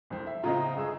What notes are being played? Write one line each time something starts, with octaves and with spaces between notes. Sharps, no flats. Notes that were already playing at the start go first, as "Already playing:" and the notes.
C2 F2 C4
E5
A2 C#3 C4 F4 D#5 A#5
G1 G#4 E6